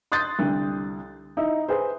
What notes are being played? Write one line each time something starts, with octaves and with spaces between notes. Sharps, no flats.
C6 D#6 F#6 G6 A6
C2 D3
D#4 E4
G#4 B4 C5